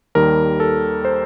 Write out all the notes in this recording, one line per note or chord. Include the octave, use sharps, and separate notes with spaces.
D#2 D#3 G3 A#4
A4
C5